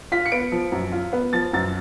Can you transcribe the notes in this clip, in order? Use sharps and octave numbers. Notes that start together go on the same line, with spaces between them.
F4 B6
C#7
B3 D7
F3
F#2
F4
B3
F3 A6
F#2 A6